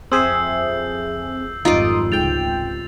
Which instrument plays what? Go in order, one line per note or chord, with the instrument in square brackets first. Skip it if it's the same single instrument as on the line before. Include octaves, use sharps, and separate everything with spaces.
[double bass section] F2 [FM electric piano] C4 G#4 E5 [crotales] E6 G6 C7
[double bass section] G#1 F2 G3 [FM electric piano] D#4 C6 D#6 [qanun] F4 D5
[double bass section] C#2 C3 [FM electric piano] G#2 G5 [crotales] A6 F7